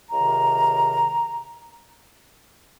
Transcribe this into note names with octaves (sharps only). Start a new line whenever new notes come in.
C#2 C3 D#3 A#5